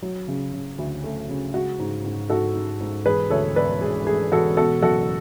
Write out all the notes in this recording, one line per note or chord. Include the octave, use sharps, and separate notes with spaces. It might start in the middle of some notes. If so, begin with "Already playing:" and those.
F#3
C#3
C#3
D2
A3
C#3
G#3 F#4
G#2
G#2
G#2 F#4 A4
G#2
G#2
E1 G#4 B4
D2 A4 C#5
E1 B4 D5
E1 G#4
A3 G#4
E1 F#4 A4
B2 F#4 A4
F#1 F#4 A4